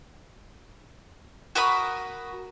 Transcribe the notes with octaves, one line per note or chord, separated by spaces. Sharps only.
F#4 A#4 B5 D#6